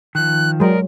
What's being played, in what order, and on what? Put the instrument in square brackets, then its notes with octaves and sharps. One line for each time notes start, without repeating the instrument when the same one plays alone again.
[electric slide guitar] D#3 F3 [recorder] F#6
[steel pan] F#3 G#3 [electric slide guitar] G#4 D5 [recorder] A#4